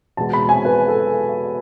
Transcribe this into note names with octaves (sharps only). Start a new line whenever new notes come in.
E2 B2 G#3 A5
B5
G#5
B4
A4